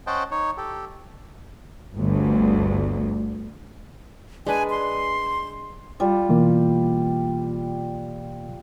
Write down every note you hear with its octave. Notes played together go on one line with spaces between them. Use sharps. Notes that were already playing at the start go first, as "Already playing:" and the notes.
C#4 C5 D#5 F#5 G5 A5
D#4 C#5
G4 A4
G1 D2
G#3 D4 B4 G#5
C6
G3 F4
B2 E3 A#3